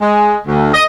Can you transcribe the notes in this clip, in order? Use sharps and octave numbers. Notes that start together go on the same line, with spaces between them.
G#3
D2
D#5